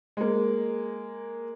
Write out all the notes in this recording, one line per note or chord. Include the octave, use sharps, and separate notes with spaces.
G#3 A#3